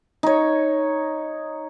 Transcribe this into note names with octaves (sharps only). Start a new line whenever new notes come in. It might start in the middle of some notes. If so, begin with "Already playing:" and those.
D#4 C#5